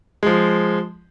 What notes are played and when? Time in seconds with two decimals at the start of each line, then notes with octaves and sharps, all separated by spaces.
0.23 F3 G#3